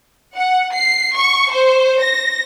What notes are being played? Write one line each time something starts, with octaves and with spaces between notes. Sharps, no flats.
F#5
C7
C#6
C5
A#6